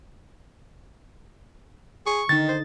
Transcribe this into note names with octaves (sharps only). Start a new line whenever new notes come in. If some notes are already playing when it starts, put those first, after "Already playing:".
G#4 C#6
D3 D#3 D#4 A6
C5